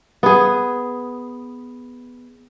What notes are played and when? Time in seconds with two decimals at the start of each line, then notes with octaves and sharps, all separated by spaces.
0.23 B3 G#4